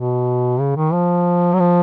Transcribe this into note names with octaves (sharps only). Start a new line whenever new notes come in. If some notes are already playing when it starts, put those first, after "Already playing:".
Already playing: B2
C#3
D#3
F3
F#3
F3